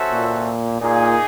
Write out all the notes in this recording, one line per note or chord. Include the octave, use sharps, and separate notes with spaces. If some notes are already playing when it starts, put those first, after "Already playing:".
Already playing: C#4 F#4 A4 C5 E5
A#2
A#2 A#3 D#4 G#4